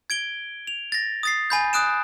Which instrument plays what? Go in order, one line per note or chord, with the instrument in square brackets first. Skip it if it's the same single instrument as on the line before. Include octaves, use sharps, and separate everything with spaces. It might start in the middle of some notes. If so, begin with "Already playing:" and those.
[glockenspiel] G#6 D7 G7
F7
A6 A#6
D#6 A6 C7
G#5 B5 G6
D#6 F#6 D7 E7